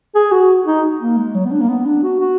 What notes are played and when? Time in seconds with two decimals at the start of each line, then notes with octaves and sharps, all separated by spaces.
0.15 G#4
0.32 F#4
0.66 D#4
1.01 A#3
1.17 G#3
1.35 F#3
1.46 B3
1.51 D4
1.61 A#3
1.69 B3
1.86 D4
2.03 F#4
2.20 F#4